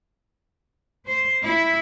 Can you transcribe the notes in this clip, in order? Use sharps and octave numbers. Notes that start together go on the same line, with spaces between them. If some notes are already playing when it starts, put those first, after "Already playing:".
C5
E4